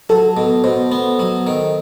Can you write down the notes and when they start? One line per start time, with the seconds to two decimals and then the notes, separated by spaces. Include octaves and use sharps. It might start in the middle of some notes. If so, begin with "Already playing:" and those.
0.09 F#3 A4
0.37 B2
0.64 B2 C5
0.92 B3
1.19 F#3
1.47 D#3